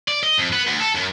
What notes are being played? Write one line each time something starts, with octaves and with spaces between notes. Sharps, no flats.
D5
D#5
F2
B3
D2
A4
F#2